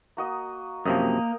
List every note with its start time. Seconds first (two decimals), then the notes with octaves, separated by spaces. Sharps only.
0.17 A#3 F#4 D#5
0.86 F#2 C3 F3 A#3 D#5 G5 D6